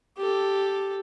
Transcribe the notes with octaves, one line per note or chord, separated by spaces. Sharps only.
G4 A4